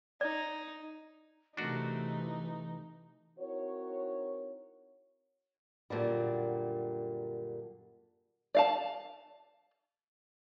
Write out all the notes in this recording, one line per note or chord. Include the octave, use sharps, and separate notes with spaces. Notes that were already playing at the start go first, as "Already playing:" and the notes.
D#4 D5
C3 E3 A3 D4 D#4 F#4 A#4
C4 D#4 E4 F#4 A#4 C#5
F#2 A#2 D3 G3
D5 F5 A5